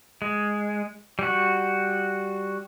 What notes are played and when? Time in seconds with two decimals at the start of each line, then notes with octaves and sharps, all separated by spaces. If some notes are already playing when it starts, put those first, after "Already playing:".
0.22 G#3
1.19 G3 F#4